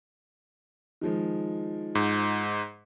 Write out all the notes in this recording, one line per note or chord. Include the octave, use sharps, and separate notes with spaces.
D#3 F3 G#3
G#2